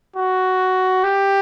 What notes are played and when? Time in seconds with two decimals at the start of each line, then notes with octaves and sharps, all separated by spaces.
0.16 F#4
1.04 G4